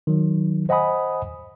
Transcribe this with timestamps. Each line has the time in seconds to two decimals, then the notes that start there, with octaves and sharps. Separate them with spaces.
0.07 D#3 F#3
0.69 C5 D#5 F#5 G#5 B5 D#6